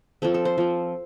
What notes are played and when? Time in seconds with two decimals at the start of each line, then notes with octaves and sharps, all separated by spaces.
0.22 F3 C4 A4
0.34 A4
0.45 C5
0.58 F3 C4